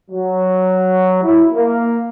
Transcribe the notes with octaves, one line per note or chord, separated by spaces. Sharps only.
F#3
E4
A#3